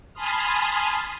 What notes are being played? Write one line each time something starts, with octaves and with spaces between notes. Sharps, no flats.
G#5 A5 B5 C6 D#6 F6